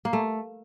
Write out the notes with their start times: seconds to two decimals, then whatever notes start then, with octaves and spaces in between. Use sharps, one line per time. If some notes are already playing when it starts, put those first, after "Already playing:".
0.05 A#3
0.13 A3